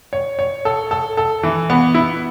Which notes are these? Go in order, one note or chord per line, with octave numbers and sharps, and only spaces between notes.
C#5
C#5
A4
A4
A4
E3
B3
E4